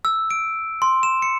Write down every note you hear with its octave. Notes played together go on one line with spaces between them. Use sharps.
E6
D7
C6
E7
C#7